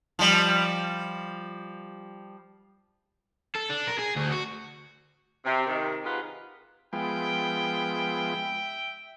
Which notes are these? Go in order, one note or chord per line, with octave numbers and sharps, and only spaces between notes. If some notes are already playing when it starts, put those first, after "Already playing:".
F3 G3
A4
D4
A#4
G#4
D2
F#4
C3
C3 D#3
C3 D#4 F4 G#4 B4 F#5
F3 G#3 B3 E5 G5